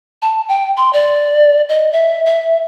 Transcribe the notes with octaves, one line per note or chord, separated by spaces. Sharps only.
A5
G5
C6
D5
D#5
E5
E5